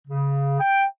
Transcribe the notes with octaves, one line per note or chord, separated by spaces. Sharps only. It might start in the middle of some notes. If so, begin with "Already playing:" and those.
C#3
G5